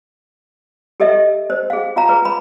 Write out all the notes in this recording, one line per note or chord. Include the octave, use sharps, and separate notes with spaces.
G4 A4 D#5 E5
C5
G#4 F5
F4 F5 A#5
G#4 B4
B5